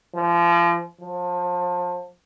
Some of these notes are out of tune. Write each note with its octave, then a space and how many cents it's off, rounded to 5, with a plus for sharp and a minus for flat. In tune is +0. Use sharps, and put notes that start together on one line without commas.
F3 -30
F3 +30